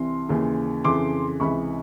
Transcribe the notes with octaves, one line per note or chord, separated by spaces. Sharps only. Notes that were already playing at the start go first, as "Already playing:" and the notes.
Already playing: C2 C3 E3 C6
D#2 C#3 E3
F2 C#3 E3 C6 D6
C#2 C3 E3 B5 C#6